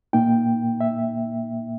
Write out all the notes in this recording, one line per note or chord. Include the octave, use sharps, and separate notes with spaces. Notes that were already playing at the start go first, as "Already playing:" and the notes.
A#2 A#3 D#4 G5
E5